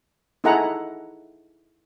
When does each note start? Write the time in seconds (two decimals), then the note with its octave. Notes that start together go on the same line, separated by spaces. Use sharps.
0.44 D#4 E4 G#4 A4 F#5 A#5